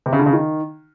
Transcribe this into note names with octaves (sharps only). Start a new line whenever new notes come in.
C3
C#3
D3
C#3
D#3